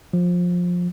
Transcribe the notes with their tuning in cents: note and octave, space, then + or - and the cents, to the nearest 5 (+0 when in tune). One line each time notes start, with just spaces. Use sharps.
F3 +20